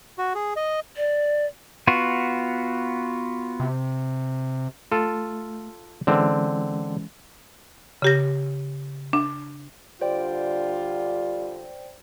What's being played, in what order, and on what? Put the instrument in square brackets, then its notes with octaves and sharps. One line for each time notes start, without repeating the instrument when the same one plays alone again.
[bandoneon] F#4
G#4
D#5
[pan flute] D5
[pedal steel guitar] B3 F4 F#4
[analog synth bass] C3
[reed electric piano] A3 [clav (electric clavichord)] F4 A4
[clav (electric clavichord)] D3 C4 [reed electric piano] E3 G#3 C#4
[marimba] C#3 G4 A#6
D4
[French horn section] D3 F4 [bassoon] G3 [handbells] C5 D5 G5